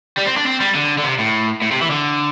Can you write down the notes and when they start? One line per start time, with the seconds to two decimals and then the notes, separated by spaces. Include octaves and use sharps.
0.17 G3
0.26 C4
0.36 D4
0.46 C4
0.60 G3
0.75 D3
0.98 D3
1.04 C3
1.18 A2
1.62 A2
1.71 C3
1.81 E3
1.90 D3